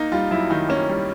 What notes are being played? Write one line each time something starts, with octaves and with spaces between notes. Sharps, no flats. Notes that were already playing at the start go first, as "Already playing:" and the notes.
Already playing: A#3 D#4
G3 F4
F#2 E4
D#3 D#4
A#3 C#4
G3